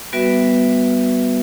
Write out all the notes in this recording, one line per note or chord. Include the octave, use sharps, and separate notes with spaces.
G3 B3 F#4 B4 E5